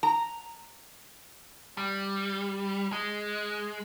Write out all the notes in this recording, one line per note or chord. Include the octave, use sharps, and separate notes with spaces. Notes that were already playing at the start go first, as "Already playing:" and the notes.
A#5
G3
G#3